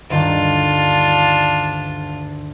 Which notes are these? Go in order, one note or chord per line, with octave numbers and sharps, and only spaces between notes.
D2 G2 D#3 D4 F4